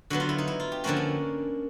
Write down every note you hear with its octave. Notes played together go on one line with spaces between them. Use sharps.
D3 F#3 B3 F#4
F4
E4
D#4
E4
F4
G4
D3 F3 A#3 C#4 F#4
D4